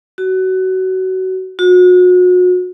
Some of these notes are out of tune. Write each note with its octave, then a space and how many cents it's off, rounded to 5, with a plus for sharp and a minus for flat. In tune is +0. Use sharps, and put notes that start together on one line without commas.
F#4 +20
F#4 -35